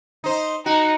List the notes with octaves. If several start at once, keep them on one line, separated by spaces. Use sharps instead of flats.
D#4 C5
D#4 F#4